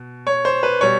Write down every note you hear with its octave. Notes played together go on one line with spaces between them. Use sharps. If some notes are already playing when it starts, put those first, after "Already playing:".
Already playing: B2
C#5
C5
B4
B2 G3 C#5